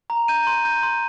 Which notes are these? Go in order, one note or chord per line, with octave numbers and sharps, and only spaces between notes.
A#5
G6 D#7
C6
G6
C6